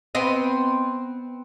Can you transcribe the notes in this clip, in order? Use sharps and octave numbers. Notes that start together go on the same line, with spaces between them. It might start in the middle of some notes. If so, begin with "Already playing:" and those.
B3 C4 D#5